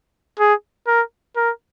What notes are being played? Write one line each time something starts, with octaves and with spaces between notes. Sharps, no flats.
G#4
A#4
A#4